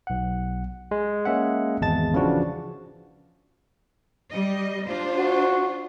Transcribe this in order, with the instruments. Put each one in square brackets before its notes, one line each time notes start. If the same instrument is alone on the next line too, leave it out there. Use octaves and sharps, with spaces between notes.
[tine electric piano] B1 F#5
G#3
G#3 A#3 C#4 E5 F#5
G#1 E2 G#3 A5 A6
C#3 E3 F3 D4 F#4
[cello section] G3 D#5
D4 F4 C5
[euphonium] F#4